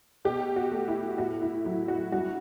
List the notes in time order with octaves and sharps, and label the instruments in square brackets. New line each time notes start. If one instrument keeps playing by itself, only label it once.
[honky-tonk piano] B2 G4
F#4
A3
E4
A2 F#4
E4
F#3 E4
F#4
G2 F#4